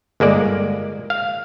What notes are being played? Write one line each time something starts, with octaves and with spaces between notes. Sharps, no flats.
G1 G#3 A#3 D5
F5